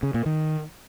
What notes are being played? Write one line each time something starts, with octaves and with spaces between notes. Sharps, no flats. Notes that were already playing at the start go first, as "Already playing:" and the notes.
C#3
A#2
D#3